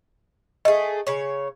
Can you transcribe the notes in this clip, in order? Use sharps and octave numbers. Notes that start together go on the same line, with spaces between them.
A3 G#4 D#5
C#3 C#5